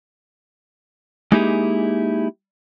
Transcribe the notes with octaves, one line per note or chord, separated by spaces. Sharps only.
G#3 A#3 D#4 E4 G4 G#4